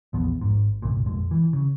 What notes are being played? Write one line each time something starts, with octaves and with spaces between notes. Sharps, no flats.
A#1 E2 F3 B3
G#1 G#2
G1 C2 A#2
A#1 F2 G#3
E3
C#3